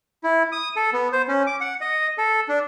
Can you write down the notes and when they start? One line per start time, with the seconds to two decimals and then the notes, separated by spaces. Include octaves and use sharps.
0.24 E4
0.52 D#6
0.76 A4
0.93 B3
1.13 C5
1.28 C#4
1.47 D6
1.61 F#5
1.81 D#5
2.18 A4
2.49 D4